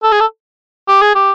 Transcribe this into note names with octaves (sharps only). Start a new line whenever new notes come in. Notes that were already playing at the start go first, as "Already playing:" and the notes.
A4
G#4
A4
G4
G#4
G4